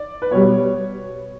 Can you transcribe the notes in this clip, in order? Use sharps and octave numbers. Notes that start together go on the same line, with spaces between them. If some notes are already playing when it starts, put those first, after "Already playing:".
Already playing: D5
B4
B2 G3 C#5